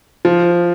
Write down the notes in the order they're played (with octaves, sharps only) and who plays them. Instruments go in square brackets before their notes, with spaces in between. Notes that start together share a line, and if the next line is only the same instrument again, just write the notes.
[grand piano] F3